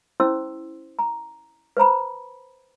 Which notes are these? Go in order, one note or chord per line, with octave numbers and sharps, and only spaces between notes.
C#4 E4 C5 C6 E6
A#5
B4 C5 A#5 B5